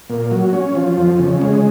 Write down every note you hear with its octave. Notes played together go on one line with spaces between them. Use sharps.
A#2
F#3
C#4
F3
F2
C#3
G#3